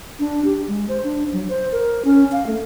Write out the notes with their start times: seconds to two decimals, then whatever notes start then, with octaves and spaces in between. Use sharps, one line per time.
0.20 D4
0.45 G4
0.68 G#3
0.88 C5
1.04 D4
1.33 F#3
1.49 C5
1.72 A#4
2.05 C#4
2.32 F5
2.47 A3